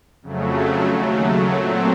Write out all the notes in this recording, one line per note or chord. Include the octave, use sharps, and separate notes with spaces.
F2 C#3 F#3 A3
D#2 C#3 F#3 A3
A#2 F#3 A3 C4